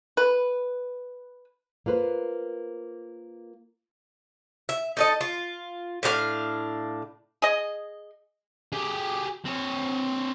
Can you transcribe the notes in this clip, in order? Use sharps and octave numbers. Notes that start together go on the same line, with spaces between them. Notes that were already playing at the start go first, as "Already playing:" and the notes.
B4
A#3 F4 B4 C5
E5
D#4 A4 D#5
F4
A2 D4 G4 F5
G#4 D#5
G4 G#4
C4 C#5